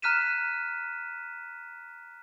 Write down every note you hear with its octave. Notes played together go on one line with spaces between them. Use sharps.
A#5 F6 F#6 B6 D#7 E7